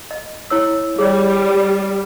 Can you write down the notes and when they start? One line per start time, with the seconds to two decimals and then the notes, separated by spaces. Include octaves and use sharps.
0.11 D#5
0.50 E4 C#5 E6
0.99 G3 G#4 C#5 D5